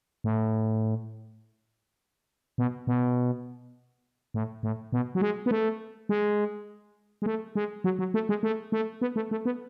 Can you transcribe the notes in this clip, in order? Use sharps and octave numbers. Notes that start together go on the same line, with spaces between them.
A2
B2
B2
A2
A2
B2
F#3
G#3
B3
A3
G#3
G#3
A3
G#3
F#3
F#3
A3
G#3
A3
A3
B3
A3
A3
B3